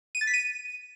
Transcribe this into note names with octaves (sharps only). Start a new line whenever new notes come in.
D#7
A6
B6
D#7